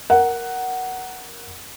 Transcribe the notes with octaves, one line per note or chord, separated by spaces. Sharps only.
A#4 F#5